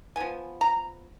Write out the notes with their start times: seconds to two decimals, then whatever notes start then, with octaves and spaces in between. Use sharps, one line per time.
0.16 F3 B3 G#5
0.61 A#5